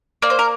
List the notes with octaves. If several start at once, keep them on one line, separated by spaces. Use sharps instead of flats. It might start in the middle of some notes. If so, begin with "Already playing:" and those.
A#3 D5
C5
A#4